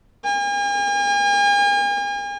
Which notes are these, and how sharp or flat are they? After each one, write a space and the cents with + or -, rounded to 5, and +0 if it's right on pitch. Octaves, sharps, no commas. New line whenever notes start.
G#5 -45